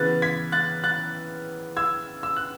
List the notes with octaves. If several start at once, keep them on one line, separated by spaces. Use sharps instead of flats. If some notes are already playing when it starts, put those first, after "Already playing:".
Already playing: C#3 E3 B3 F#6 A6
G#6 B6
F#6 A6
F#6 A6
E6 G#6
E6
F#6